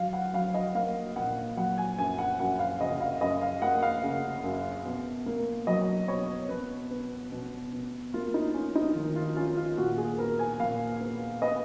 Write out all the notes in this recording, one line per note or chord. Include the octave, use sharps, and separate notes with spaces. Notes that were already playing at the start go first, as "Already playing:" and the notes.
Already playing: F#3 F5
F#5
F#3 F5
D#5
A#3 F5
A#2 F#5
F#3 F#5
G#5
F#2 G#5
F#5
F#2 F#5
F5
C#3 D#5
F5
F#2 D#5
F5
A#3 F#5
F5
C#3
F#2
B2
A#3
F#3 D#5
B2 C#5
B2 B4
B3
B2
B2
A#3 F4
D#4
C#4
D#4
D#3 F4
F4
C#4 F4
F4
A#2 F#4
G#4
B3 A#4
G#5
A#2 F5
B3
B3 D#5